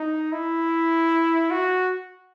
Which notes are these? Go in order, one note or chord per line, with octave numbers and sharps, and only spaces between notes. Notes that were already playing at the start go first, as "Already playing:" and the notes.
Already playing: D#4
E4
F#4